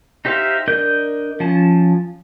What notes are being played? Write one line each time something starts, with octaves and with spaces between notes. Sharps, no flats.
D#4 G4 C5 E5 F5
D4 A#4 D#5 G6
F3 C#4 A5